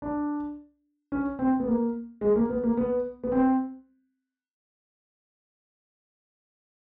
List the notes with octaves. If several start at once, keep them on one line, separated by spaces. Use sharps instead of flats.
D4
C#4
C4
B3
A#3
G#3
A#3
B3
A#3
B3
B3
C4